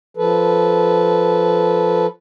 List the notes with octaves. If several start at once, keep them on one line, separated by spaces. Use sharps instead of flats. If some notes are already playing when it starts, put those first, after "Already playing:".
F3 A4 B4